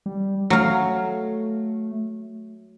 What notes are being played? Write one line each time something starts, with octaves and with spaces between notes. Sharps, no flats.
G3
F#3 A3 F5